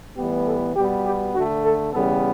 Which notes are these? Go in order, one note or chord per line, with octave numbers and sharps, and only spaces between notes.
A2 E3 G3 B3 G4
A4
B2 G3 B3 G4
G4
D3 A3 F#4
A4
C#3 E3 G3 B3 A4